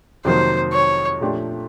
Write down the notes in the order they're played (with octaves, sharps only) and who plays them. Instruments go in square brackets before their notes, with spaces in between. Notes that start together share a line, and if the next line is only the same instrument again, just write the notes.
[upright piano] F2 C3 D#3 F#3 A#3 [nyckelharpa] C5
[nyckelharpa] C#5
[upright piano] A#2 F3 A3 D4 G4